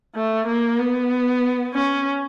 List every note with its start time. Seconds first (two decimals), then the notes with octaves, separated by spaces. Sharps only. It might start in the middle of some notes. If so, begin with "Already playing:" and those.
0.15 A3
0.47 A#3
0.79 B3
1.73 C#4